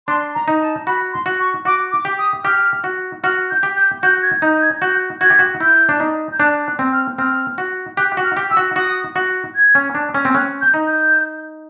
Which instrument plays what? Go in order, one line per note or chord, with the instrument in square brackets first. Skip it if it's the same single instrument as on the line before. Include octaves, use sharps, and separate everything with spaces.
[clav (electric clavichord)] D4 [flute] C6
[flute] A#5
[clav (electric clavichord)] D#4
[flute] A5
[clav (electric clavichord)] F#4 [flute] B5
[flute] C6
[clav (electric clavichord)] F#4
[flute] C#6
[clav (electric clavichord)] F#4 [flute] D6
[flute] D6
[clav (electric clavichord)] G4
[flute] D#6
[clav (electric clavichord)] G4 [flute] F6
[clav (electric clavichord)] F#4
[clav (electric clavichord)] F#4 [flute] F6
[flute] G6
[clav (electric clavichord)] G4
[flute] G6
[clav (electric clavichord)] F#4 [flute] G6
[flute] G#6
[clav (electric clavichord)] D#4 [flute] G6
[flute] G6
G#6
[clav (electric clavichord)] F#4 [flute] G6
[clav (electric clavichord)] F#4 [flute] G#6
[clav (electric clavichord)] G4
F#4
[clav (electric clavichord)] E4 [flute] G6
[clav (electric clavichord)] D4
D#4
[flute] G6
[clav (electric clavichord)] D4 [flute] F#6
[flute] F#6
[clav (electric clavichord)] C4
[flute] F6
[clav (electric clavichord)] C4 [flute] F6
[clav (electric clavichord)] F#4
[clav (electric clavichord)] G4 [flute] F#6
[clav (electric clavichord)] F#4
[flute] F6
[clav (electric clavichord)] G4
[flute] E6
[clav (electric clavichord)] F#4
[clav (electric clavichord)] F#4 [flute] D#6
[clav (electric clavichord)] F#4
[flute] G#6
[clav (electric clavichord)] C#4
D4
C#4
C4
[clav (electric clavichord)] C#4 [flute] F#6
[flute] G6
[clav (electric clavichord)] D#4
[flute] G6